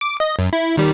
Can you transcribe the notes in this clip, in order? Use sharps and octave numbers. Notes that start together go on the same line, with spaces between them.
D6
D#5
F#2
E4
D#3 G3